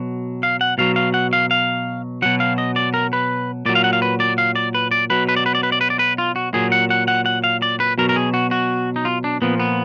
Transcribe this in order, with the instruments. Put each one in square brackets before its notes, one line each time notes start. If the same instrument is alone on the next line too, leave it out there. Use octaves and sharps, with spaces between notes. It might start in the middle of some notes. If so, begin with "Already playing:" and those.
Already playing: [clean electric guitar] B2 F#3
F5
F#5
B2 F#3 F5
F5
F#5
F5
F5
B2 F#3 F#5
F5
D#5
D5
A#4
B4
A#2 D5
F#3
F5
F#5
F5
B4
D5
F5
D5
B4
D5
B2 F#3 B4
B4
D5
B4
D5
B4
D5
B4
D5
B4
F4
F#4
A#2 F#3 G#4
F#5
F#5
F#5
F#5
F5
D5
B4
B2 F#3 A#4
A#4
G#4
F#4
F#4
D#4
F4
D4
A#2 F3 B3
B3